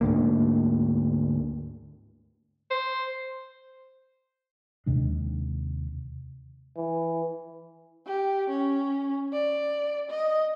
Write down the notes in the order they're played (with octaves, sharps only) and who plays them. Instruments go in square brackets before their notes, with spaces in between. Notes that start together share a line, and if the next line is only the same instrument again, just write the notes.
[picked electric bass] D2 G#2 D3 A#3
[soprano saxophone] C5
[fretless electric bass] D#2 C3 G#3 D4
[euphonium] E3
[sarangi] G4
C#4
D5
D#5